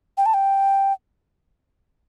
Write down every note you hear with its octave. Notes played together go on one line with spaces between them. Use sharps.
G5
A5
G5